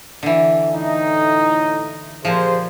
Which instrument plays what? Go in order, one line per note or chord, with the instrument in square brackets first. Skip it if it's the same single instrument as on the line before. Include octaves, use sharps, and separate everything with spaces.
[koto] D3 E3
[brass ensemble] A2 D#4
[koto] A#2 F3 [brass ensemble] G4 G#4 C5